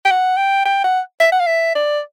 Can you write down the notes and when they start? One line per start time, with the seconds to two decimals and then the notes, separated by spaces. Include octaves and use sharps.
0.05 G5
0.11 F#5
0.37 G5
0.65 G5
0.84 F#5
1.20 E5
1.32 F#5
1.40 F5
1.47 E5
1.75 D5